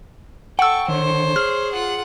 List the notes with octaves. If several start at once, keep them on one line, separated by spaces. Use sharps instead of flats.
A4 F#5 G5 C#6 E6
D3 D#3 C5 C#5
G#4 F6
F4 F#5